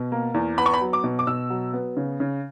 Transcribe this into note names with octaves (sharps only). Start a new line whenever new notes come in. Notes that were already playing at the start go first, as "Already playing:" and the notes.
Already playing: B2
A#3
E2
B3 B5
C#6
B5
F#3
D6
B2
D6
B2 E6
F#3
B3
C#3
C#3